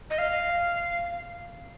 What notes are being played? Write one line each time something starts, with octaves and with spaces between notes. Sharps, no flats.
D#5
F5